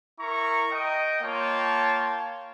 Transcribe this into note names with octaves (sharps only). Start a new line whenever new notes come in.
E4 A#4 A#5 C#6
D#5 G5
A#3 F4 C#5 G5 A5